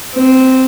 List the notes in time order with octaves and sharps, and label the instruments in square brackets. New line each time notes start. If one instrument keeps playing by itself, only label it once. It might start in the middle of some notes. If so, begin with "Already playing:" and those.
[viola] C4